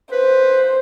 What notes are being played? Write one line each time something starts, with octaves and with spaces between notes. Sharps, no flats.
B4 C5